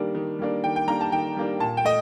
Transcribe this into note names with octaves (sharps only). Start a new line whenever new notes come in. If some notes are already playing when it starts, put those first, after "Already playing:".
Already playing: D#3 G3 A#3 D4
D#3
G3 A#3 D4
D#3 G5
G5
G3 A#3 D4 A#5
A5
D#3 G5
G3 A#3 D4
A#2 A5
G5
A3 D#5